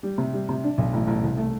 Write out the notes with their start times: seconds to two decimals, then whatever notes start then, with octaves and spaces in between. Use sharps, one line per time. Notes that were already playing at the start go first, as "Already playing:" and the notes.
0.03 G3
0.18 C3
0.33 G3
0.49 C3
0.64 D4
0.78 B1
0.93 A1
1.07 A1
1.23 C2
1.37 A3